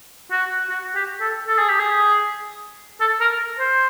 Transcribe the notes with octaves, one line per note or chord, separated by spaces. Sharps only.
F#4
F#4
G4
A4
A4
G#4
G4
G#4
A4
A#4
C5